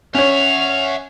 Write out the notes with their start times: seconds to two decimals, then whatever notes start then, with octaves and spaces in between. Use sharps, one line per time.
0.15 C#4 C#5 E5 F#5 F7